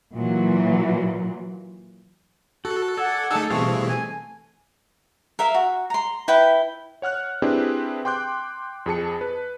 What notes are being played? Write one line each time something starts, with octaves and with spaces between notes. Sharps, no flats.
A#2 E3 F#3
F#4 A4
D5 F#5 G#5 E6
A3 D#4 G#4 A4 A5 E6
B2 E3 G3 C4 G#4 F5 C#6
G#5
A#4 E5 F5
F#4
A#5 C6
E4 B4 G5 B5
C#5 F#5 F6 F#6
C4 D4 E4 G4 G#4 B4
G5 C6 D6 F#6 G6
F2 G#4 A5 C#7
B4